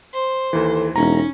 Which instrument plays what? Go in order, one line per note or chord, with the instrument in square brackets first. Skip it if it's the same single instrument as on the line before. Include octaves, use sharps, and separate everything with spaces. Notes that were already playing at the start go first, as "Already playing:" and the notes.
[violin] C5
[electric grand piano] D#2 E3 [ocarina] A4
[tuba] E1 [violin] C#4 [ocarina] D#4 [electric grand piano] A#5